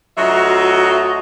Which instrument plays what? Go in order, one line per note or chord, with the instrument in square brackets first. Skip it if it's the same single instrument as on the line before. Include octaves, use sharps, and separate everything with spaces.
[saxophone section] D2 F#3 F4 F#4 D#5 E5